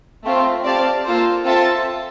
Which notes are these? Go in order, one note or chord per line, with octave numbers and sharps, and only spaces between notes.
A3 C4 F4
C4 G4 D5 F5 A5
A#3 F4 A4 C5
C4 F4 A4 E5 A5